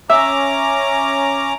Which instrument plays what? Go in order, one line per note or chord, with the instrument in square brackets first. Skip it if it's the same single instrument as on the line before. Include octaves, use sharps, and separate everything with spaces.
[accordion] C#4 A#5 D6 [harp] E5